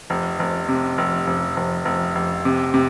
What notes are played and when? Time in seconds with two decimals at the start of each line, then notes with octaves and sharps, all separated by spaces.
0.10 F1
0.39 F1
0.68 C3
0.98 F1
1.27 F1
1.57 F1
1.85 F1
2.15 F1
2.45 C3
2.74 C3